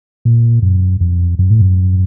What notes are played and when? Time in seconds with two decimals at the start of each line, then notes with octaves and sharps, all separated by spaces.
0.25 A#2
0.62 F#2
1.01 F2
1.39 F#2
1.50 A2
1.61 F#2